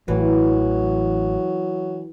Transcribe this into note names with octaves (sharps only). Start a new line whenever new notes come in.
A1 A2 E3 F#3